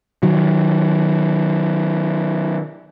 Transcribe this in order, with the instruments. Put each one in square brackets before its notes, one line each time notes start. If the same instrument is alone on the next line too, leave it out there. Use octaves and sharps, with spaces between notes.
[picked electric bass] D#3 F#3